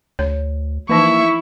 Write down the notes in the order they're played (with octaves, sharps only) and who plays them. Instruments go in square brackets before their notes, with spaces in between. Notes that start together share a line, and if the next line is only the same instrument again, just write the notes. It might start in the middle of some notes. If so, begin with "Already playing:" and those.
[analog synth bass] D2 [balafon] C#5
[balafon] E3 F3 D#4 [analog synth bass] A#3 [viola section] E4 [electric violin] E5 C#6